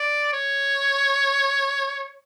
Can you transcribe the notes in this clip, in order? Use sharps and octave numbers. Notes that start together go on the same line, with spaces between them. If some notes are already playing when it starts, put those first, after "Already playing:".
Already playing: D5
C#5